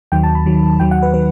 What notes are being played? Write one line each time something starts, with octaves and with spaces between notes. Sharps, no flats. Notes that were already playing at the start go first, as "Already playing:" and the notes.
D#2 D#3 F#3 G5
A5
B5
D#2 D#3 F#3
D#2 D#3 F#3 G5
F#5
B4
D#3 F#3 B4